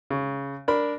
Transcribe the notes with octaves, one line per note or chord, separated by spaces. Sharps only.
C#3
D4 A#4 B5